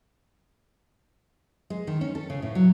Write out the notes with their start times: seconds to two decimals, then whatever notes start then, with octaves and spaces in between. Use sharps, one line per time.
1.70 G#3
1.87 D#3
2.01 C#4
2.15 A4
2.30 C#3
2.42 A2
2.55 F#3